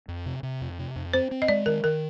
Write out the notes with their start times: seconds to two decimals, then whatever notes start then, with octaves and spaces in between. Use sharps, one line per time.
0.08 F2
0.26 C3
0.43 C3
0.61 F2
0.79 C3
0.96 F2
1.13 C4 C5
1.31 C4
1.42 D#5
1.48 G#3 D5
1.66 D#3 A#4
1.84 D#3 A#4